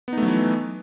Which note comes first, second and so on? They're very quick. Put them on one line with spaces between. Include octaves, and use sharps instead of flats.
B3 D#4 A3 F#3 E3